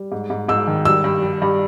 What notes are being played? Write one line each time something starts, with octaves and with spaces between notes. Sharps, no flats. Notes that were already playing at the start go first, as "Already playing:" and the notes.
Already playing: G3
G#2
G#2
G#2 E6
D#3
G3 E6
G2
G3
G2